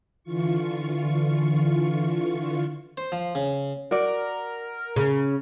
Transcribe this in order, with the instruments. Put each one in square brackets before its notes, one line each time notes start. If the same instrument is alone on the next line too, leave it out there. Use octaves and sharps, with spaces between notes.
[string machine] D3 E3 F4 C#6
[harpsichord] C5
F3
C#3
[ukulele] F#4 D5 [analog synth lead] A#4
[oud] C#3